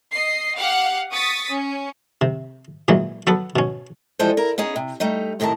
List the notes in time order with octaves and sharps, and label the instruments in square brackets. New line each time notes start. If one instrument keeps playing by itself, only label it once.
[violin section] D#5 C7
G4 F5 F#5
C#6 D#6 A6 B6
C#4
[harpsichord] C3
A#2 E3 F#3 G#3
F#3 B3 A4 B4
B2 C#4
[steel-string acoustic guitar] E3 F3 G3 G#3 A4 C5
E4 A#4
B3 C#4 D#4 G#4
C3
G3 A3 D#4
A2 C3 D#3 A#4 A5